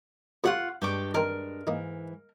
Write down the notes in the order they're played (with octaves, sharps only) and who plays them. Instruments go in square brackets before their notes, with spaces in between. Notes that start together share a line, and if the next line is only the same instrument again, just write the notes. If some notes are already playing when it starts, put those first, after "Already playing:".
[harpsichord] F2 C3 F3 [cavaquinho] F4 F#5 C#6
[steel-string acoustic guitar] G2 G#3 D4 [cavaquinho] G4 C#6 D6
[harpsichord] D#3 C4 [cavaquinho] A#4
[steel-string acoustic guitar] G#2 E3 [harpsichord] A#3 D#4